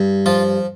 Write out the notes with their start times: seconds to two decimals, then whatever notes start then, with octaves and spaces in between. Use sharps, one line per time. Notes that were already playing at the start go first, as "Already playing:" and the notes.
Already playing: G2
0.26 F3 F4